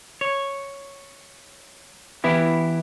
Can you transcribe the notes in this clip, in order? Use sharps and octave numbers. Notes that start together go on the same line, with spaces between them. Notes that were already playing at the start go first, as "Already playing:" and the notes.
C#5
E3 B3 E4 G4